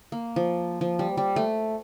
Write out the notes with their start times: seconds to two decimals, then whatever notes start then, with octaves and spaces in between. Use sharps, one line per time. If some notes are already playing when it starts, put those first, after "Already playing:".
0.12 A#3
0.36 F3
0.81 F3
0.99 G3
1.17 G3
1.36 A3